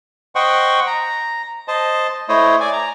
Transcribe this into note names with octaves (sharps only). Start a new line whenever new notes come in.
C5 D#5 F#5 G5 C#6
A#5
C5 D#5 A5
A3 E4 C5 C#5 D#5
D5 G#5
A#5